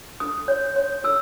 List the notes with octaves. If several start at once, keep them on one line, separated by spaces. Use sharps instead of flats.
A4 D#6
C#5
C#5
A4 E6